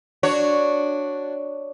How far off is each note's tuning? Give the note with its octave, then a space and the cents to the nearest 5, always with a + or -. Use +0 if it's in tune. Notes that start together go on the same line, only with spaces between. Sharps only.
D4 +0 F#4 +0 C#5 +0